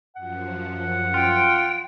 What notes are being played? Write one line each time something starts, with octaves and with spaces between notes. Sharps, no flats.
F#2 F3 F#5
F4 G5